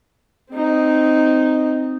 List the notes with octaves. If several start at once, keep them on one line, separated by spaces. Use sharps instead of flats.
C4 D#4